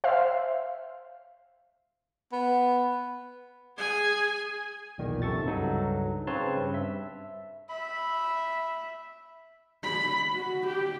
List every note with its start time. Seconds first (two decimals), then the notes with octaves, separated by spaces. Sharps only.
0.04 C5 E5 F5
2.32 B3
3.77 G#4 G#5
4.98 B1 E2 A#2 D#3
5.22 F#2 C3 A4 C#6 A6
5.47 C#2 G2 F#3 D#4 A4
6.27 C#3 C4 B4 C#5 A5 C6
6.57 G2
6.74 E5
7.70 E5 B5
9.84 B5
10.33 F#4
10.67 G4